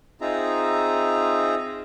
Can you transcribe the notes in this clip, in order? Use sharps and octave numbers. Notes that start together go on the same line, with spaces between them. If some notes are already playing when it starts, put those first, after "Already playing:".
C4 D#4 F4 G#4 E5 A#5